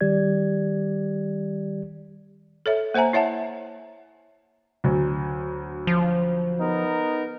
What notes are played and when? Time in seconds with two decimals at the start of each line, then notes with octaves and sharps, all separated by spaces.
0.01 D#3 G3 G4 D5 G#6
2.66 A4 C#5 E5
2.94 A#3 C5 E5 G#5 A#5
3.13 E4 C#5 E5 F#5 A5
4.84 D2 F#3
5.87 F3
6.59 B3 D#4 A#4